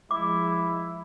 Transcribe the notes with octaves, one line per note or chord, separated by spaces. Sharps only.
F3 G#3 E4 D6